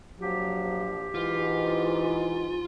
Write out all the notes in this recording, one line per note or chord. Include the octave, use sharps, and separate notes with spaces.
A#1 F3 F#3 G4
G#2 E3 F4